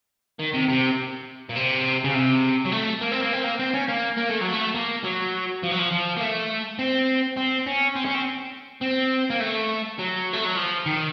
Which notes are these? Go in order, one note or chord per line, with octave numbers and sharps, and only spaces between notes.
D#3
C3
C3
A#2
C3
C#3
C3
F#3
A3
A#3
C4
A#3
C4
A#3
C4
C#4
A#3
A#3
A3
F#3
A3
A#3
F#3
F3
F#3
F3
F3
A#3
A3
C4
C4
C#4
C4
C#4
C4
C4
A#3
A3
F#3
A3
F#3
F3
D#3